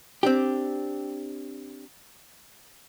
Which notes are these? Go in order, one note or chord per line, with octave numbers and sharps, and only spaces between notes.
C4 D4 G4